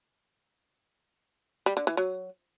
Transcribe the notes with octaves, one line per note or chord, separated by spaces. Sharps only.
G3
D3
E3
F#3